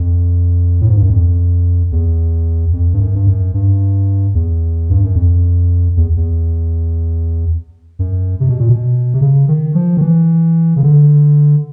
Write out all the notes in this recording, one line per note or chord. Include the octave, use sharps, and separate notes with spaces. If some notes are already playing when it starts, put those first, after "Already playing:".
Already playing: F2
A2
G#2
G2
F#2
F2
E2
F2
G2
F#2
G2
F#2
G2
E2
G2
F#2
F2
E2
E2
F#2
C3
B2
A#2
B2
C3
C#3
D#3
F3
D#3
E3
C#3
D3